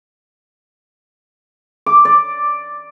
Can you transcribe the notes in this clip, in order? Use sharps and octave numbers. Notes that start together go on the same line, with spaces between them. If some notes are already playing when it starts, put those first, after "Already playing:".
D6
D5